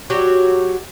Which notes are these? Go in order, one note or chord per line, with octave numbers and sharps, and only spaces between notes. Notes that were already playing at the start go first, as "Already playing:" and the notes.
F#3 F#4 G4